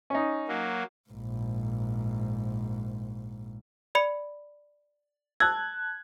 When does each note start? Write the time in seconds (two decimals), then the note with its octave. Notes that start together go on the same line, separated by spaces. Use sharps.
0.10 C#4 D#4
0.48 F#3 A#3
1.10 A#1 G#2
3.95 D5 B5 C#7
5.40 A5 E6 F#6 G#6